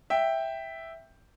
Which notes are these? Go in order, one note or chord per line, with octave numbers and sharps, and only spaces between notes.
E5 G5